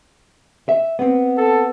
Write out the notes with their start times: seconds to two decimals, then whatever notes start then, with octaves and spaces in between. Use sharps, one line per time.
0.69 E5
0.99 B3 C4
1.38 A4